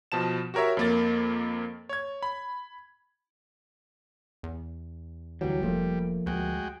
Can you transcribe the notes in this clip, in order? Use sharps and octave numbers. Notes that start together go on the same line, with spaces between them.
B2 F3 A5 E7
F#4 G4 A#4 C#5 E5
F2 A#3 A6
C#5 G#6
B5
E2
D2 E3 F#3 G3
F1 F3 A3 A#3
D2 G#3 F#4 G5